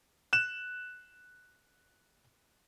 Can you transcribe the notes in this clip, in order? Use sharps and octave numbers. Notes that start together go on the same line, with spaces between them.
F#6 E7